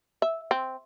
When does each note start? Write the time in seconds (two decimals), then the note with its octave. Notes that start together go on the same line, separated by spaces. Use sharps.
0.22 E5
0.51 C4